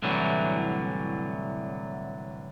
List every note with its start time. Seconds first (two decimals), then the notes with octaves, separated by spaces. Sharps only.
0.02 C2 A2 D3 E3 F#3